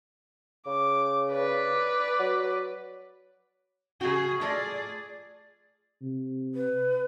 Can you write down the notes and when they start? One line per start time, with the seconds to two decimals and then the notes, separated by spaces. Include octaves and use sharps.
0.66 C#3 D6
1.32 B4 D5
2.20 F#3
4.01 C#3 F#4 G#4
4.41 A3 F4 G#4 D5 D#5
6.02 C3
6.55 B4